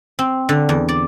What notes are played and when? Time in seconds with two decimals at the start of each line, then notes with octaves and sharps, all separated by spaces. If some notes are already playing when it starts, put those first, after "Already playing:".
0.19 C4
0.49 D3
0.69 E2
0.89 D5